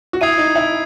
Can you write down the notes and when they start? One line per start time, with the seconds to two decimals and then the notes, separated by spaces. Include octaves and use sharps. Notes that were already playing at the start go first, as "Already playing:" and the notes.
0.13 F#4
0.21 E4 D#6 G#6 C7 D#7
0.38 D#4
0.56 E4